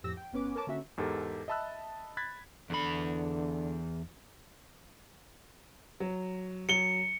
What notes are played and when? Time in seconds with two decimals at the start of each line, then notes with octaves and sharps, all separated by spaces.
0.03 F2 A2 F3 G4 E6 A#6
0.17 G5
0.33 G1 B3 C#4 B4 D6
0.55 A#4 B4 C#5 A5 D6
0.67 D3 A#3 C#4 F#4 E5
0.97 E2 G#2 G4 A4 A#4
1.48 D#5 E5 A5 B5 E6 F#6
2.17 B5 F#6 G#6 A6 B6
2.70 E2 D3 B5
6.00 F#3
6.69 F#3 C#7 G7